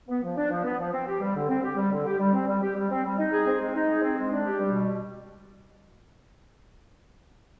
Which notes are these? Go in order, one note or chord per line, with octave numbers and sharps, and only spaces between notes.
B3
F3
D4
F3
B3
F3
C4
G4
G3
D3
C4
G4
G3
D3
G4
G3
C4
G3
G4
G3
C4
G3
D#4
G#4
C4
G#3
D#4
G#4
C4
G#3
D4
G4
G3
B2